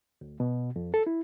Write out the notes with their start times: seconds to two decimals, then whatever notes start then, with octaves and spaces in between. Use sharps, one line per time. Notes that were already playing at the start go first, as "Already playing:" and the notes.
0.21 D2
0.40 B2
0.76 F2
0.94 A4
1.07 E4